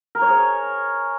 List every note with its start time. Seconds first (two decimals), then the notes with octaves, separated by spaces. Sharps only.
0.15 A#4
0.22 C#5
0.29 G#4